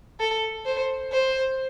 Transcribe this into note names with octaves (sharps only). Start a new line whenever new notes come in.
A4
C5
C5